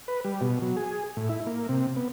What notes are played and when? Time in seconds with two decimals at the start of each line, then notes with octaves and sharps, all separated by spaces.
0.08 B4
0.25 G3
0.41 B2
0.62 F#3
0.77 G#4
1.17 A2
1.29 E4
1.47 A#3
1.69 C3
1.96 B3